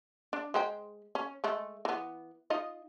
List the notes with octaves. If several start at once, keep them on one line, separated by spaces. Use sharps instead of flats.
D4
G#3 C5 G5
C#4
G#3 A3
E3 B3
D#4 F4 D#5